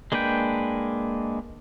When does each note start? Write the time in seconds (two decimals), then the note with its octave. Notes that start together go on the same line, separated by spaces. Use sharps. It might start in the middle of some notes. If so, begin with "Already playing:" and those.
0.12 G#3 A#3 D4 B4 G5